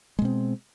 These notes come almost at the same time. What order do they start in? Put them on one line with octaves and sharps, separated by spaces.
G#3 B2 C4